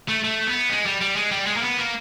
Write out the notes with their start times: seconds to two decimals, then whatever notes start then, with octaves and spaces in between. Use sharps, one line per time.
0.08 A3
0.24 A3
0.47 B3
0.70 G#3
0.86 G3
1.01 G3
1.16 G#3
1.31 G3
1.47 G#3
1.57 A#3
1.62 B3
1.77 A#3